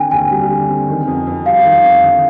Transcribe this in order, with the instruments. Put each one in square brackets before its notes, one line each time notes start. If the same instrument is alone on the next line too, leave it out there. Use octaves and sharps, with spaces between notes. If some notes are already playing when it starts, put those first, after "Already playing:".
Already playing: [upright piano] D3 C4 [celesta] G5 G#5
[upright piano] D#2 [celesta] G#5
[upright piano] G3
D3
C4
D#3
F2
F2
[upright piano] G3 [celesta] F5
[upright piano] D#3
F2
D3